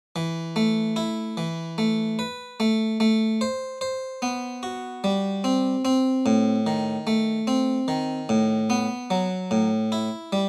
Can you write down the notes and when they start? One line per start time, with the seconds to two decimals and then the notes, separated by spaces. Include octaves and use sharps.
0.16 E3
0.56 A3
0.96 E4
1.37 E3
1.78 A3
2.19 B4
2.60 A3
3.00 A3
3.41 C5
3.81 C5
4.22 B3
4.63 F#4
5.04 G3
5.44 C4
5.85 C4
6.26 A2
6.67 D#3
7.07 A3
7.47 C4
7.88 D#3
8.29 A2
8.70 B3
9.10 F#3
9.51 A2
9.92 E4
10.33 G3